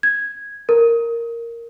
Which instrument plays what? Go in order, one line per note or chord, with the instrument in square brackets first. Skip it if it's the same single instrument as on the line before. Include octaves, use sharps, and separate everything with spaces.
[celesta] G#6
A#4